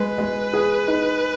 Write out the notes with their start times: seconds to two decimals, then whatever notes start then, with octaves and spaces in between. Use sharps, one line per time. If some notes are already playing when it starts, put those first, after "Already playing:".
Already playing: G#3 B4
0.18 G#3
0.53 G#4
0.88 D#4